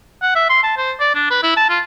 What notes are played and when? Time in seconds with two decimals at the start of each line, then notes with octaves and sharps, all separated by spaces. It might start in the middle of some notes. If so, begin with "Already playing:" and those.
0.22 F#5
0.35 E5
0.49 C6
0.63 A5
0.77 C5
1.00 D5
1.15 D4
1.30 B4
1.43 E4
1.57 A5
1.69 F4